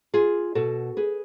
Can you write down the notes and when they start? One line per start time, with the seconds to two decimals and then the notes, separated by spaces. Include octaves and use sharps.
0.14 F4 G#4
0.55 B2 F#4 A4
0.97 G#4 B4